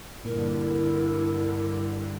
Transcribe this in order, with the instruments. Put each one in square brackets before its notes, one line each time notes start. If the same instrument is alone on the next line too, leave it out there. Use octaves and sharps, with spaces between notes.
[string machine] G2 D3 [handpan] A#2 [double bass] E4 [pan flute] A#4